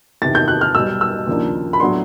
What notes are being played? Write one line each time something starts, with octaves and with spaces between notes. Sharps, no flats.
E2 C3 D#3 A6
G6
F#6
F6
B1 B2 G3 E6
E6
D#2 C#3 F3 A#3 D4
B5
A2 F#3 B3 D4 C6